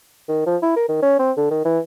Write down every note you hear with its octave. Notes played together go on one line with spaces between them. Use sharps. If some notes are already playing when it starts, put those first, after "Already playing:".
D#3
F3
E4
A#4
D#3
C#4
C4
D3
D#3
E3